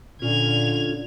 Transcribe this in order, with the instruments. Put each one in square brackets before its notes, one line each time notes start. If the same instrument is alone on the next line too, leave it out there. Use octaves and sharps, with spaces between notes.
[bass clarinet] A#2 [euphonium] D3 [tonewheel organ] C#4 F4 [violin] G#6 F7